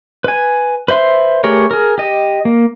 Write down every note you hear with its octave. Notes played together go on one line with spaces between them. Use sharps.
B4 G#5
B4 C5 E5 C6
A3 G4 G#4 A#4 C#5
G#4 A#4
G4 D#5
A#3